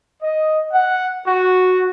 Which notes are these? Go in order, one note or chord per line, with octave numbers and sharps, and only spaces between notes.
D#5
F#5
F#4